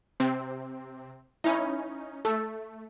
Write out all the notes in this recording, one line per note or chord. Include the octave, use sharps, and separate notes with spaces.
C3 C4
C#4 D#4 E4
A3 A4